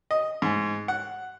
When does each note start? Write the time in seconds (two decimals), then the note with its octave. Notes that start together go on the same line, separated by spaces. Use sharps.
0.11 D#5
0.42 G#2
0.88 F#5